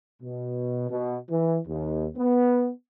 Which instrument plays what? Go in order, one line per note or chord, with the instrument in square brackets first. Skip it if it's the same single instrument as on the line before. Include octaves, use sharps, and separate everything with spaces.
[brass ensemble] B2
B2
E3
D#2
B3